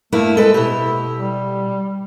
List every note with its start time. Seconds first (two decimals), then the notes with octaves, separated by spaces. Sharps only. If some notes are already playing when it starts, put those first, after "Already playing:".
0.12 G2 A3 A#3 E4
0.37 G#3 A4 B4
0.54 B2 E4 G4
1.17 G3